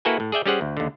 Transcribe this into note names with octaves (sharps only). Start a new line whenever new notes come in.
A#3 E4 F#4 A4 B4 G#5
A2
G#4 D5 E5 G5
G3 C#4 G4 G#4 C5 F#5
D2
D#2 D3